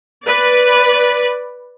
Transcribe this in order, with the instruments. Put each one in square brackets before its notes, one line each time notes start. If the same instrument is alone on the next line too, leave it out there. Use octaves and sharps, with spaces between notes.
[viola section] B4 D5